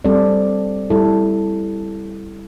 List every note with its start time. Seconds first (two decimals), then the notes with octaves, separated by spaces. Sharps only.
0.05 G3 C4 A4 D5
0.90 G3 E4 A4